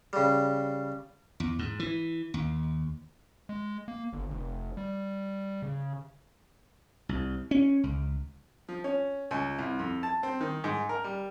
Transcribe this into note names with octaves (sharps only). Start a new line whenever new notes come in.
C#3 G3
E2
G#2
E3
D#2
G#3
A#3
G1
F1
G3
C#3
C2
C#4
C#2
F3
C#4
C#2
C2
F2
A5
C4
D#3
G#2
A#4
G3